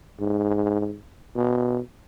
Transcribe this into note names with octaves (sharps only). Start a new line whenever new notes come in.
G#2
B2